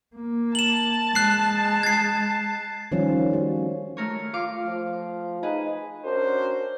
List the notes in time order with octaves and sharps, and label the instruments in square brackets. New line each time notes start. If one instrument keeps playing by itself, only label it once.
[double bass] A#3
[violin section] A5 [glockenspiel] E7 F#7
[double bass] G#3 [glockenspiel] F#6 C7
[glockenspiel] G#6 C7
[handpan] D#3 F3 G3 C#4 F4
A3 F#4
[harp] A3 A#4 C#5
[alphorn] F4 [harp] F5 D6
[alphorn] F3
[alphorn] D#4 [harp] G#4 B4
[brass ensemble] C#4 D4 F#4 A#4 C5